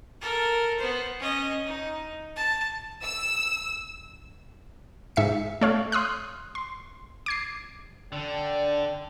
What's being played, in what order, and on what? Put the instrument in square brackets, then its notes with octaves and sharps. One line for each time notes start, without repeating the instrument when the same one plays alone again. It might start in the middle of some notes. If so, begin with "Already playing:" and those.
[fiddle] A4 A#4
B3 C5
C#4 D#5
D#4
A5
[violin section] E6
[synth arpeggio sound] G#2 E5 B6 C#7
A3 C#5 F5
C6 D#6 F6 F#6
C6
D6 G#6 C7
[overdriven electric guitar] D3 [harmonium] D4 D5 G5